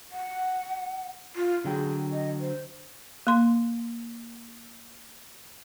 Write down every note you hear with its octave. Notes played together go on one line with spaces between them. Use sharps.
F#5
F4
D3 F#3 G#4 G5
D#5
C5
A#3 C6